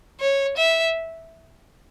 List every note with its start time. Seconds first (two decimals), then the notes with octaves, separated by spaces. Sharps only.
0.21 C#5
0.57 E5